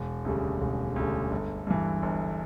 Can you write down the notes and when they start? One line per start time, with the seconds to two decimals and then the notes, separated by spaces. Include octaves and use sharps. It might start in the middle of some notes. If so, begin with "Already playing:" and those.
Already playing: E1
0.24 D2 C#3 G3
0.61 E1
0.96 D2 C#3 G3
1.31 G1
1.67 G2 E3
2.02 G1